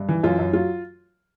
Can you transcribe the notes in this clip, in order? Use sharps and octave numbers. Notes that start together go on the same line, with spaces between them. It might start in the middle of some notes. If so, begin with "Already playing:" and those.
Already playing: G2
E3
F#2 F4
F#2
F#3 F4